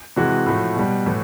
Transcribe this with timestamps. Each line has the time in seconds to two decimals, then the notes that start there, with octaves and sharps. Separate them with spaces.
0.16 C3 E3 G#3 F#4
0.46 A2 F3 A3
0.76 B2 G3
1.06 A2 E3 A3